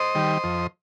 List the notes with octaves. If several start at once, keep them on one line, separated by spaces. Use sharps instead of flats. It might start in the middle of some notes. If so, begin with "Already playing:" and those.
Already playing: C5 D#5
D#3 G3
F2